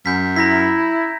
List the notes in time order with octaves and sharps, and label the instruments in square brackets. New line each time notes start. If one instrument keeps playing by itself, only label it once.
[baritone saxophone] F#2 [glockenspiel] G6 B6
[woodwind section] E4 [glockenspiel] A#5 A#6 B6